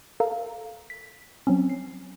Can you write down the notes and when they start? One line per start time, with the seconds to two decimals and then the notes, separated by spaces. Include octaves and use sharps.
0.20 A4 A#4 F5 A#5
0.90 B6
1.47 F#3 C4 C#4
1.69 C7